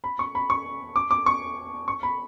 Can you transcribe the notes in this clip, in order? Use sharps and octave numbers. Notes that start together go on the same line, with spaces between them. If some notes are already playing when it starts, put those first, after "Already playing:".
B5
C#6
B5
C#6
D6
D6
C#6
C#6
B5